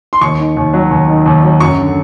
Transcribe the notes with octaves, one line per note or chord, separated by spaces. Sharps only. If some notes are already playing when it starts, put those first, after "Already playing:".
C6
D#2 C#6
D#3
D#2
F#3
D#2
D#3
D#2
F#3
F#2 C#6
D3